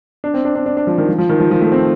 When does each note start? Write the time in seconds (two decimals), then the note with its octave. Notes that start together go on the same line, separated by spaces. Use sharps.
0.24 D4
0.34 C4
0.45 D4
0.55 D4
0.66 D4
0.77 D4
0.87 F3
0.98 D#3
1.08 F3
1.18 F3
1.29 D#3
1.40 F3
1.51 F3
1.61 A3
1.72 C4